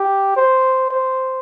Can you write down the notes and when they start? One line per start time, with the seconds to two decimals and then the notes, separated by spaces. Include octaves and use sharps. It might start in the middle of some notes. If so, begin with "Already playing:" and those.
Already playing: G4
0.37 C5
0.91 C5